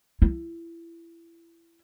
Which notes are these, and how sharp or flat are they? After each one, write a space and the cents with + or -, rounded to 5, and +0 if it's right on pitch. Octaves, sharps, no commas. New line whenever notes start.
E4 +25